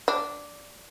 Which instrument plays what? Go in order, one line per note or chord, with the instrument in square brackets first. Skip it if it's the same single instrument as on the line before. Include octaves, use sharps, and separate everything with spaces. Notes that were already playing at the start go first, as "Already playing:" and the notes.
[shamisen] D4